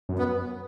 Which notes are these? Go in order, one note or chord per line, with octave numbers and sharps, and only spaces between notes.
F#2
B3